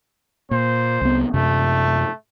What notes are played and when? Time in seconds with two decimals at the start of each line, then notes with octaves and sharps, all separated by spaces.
0.51 A#2 C5
1.01 C2 B3
1.34 F#2 C3 A3